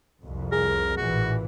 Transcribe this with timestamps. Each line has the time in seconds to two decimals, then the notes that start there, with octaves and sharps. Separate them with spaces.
0.22 C2 F2
0.52 G#4 A#4
0.97 A1 A#2 E3 F#4